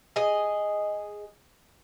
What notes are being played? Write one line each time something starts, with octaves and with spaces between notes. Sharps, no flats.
G#4 D#5